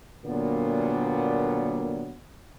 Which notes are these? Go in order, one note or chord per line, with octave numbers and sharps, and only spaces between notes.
A#2 D3 F#3 G3 A#3 B3